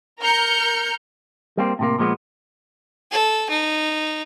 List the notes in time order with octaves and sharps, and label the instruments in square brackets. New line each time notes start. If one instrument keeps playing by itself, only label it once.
[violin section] A#4 A#5 F6 G6 C#7
[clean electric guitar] G3 A#3 C4
A2 C3 A#3
A#2 F3 G#3 B3
[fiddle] A4
D#4